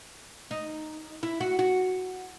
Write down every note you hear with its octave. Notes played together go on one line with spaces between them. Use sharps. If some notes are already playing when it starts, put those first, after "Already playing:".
D#4
E4
F#4
F#4